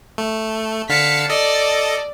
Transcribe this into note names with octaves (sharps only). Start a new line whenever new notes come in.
A3
D3 F5 A5 B6 C#7
A4 D5 D#5